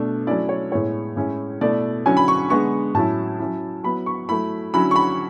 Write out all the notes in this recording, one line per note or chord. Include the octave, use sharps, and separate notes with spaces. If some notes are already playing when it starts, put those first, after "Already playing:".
Already playing: B2 A3 D4
F#3 A3 C#4 E4 D5
C#5
A2 G#3 B3 E4 C#5
A2 G#3 C#4 E4
B2 A3 E4 D5
D3 F#3 C#4 E4 G#5
B5
C#6
D3 G#3 B3 C#6
A2 F#3 C#4 E4 A5
F#3 C#4 E4
F#3 B3 E4 B5
C#6
F#3 A3 E4 B5
D3 F#3 C#4 E4 B5
C#6
B5